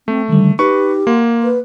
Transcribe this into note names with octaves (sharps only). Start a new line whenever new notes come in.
A3 C4
D3 D#3 G3
D#4 G4 B4 C#6
A#3 F#5 C6
B4